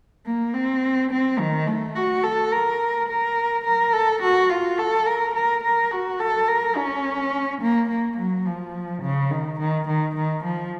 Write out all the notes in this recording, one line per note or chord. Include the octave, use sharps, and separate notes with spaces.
A#3
C4
C4
D#3
A3
F#4
A4
A#4
A#4
A#4
A4
F#4
F4
A4
A#4
A#4
A#4
F#4
A4
A#4
C#4
A#3
A#3
F#3
F3
C#3
D#3
D#3
D#3
D#3
F3